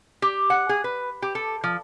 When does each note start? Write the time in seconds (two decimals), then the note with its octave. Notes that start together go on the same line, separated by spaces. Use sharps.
0.22 G4
0.50 F#5
0.69 G#4
0.84 B4
1.22 G4
1.35 A4
1.64 F3